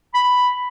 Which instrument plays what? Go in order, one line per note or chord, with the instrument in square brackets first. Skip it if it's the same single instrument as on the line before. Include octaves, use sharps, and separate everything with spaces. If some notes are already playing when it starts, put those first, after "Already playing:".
[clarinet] B5